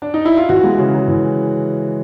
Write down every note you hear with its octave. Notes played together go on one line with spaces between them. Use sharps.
D4
D#4
E4
F4
E3 F#4
G#3
C#3
C#3
E3